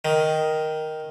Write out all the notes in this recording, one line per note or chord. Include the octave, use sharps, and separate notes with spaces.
D#3